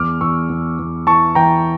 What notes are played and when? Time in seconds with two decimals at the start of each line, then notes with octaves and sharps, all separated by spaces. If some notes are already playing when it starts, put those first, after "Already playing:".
Already playing: E2 D6 F6
0.21 E2 C#6 E6
0.50 E2
0.79 E2
1.07 E3 A5 C#6
1.35 E3 G5 A#5